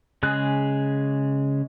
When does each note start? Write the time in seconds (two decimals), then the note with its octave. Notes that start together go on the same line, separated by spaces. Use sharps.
0.23 C#3 G#3 G#4 F#6